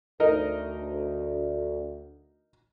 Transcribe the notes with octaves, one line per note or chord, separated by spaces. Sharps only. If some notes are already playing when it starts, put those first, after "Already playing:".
D2 D#4 A#4 D#5